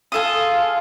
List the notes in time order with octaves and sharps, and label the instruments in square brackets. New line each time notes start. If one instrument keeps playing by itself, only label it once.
[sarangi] F4 [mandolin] G#4 A4 D#6